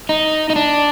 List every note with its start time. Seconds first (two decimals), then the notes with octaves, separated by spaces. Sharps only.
0.09 D#4
0.50 D#4
0.56 D4